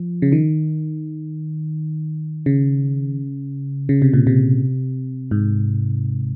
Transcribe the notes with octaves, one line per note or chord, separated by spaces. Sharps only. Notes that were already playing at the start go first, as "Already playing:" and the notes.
Already playing: F3
C#3
D#3
C#3
C#3
C3
A#2
C3
G#2